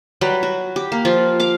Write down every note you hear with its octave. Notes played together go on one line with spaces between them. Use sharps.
F#3 G3 B4 G5
F#4
G4
A#3
F3 F4
F5 D6